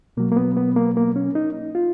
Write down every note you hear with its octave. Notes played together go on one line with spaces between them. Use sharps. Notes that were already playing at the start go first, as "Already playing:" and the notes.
B2 F#3 A#3
A#3
B3
B3
A#3
A#3
C#4
D#4
F4